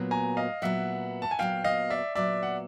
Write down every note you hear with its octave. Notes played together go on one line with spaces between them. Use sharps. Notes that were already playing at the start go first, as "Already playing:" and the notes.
Already playing: A#2 F#3 B3
G#5 A#5
D#5 F5
A#2 F#3 B3 E5 F#5
A5
G#5
A#2 F#3 B3 F5 G5
D#5 F5
D5 E5
A#2 F#3 B3 D5 E5
F#5